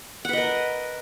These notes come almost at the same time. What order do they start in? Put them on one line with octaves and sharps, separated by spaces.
F#5 B4 D#5 A#4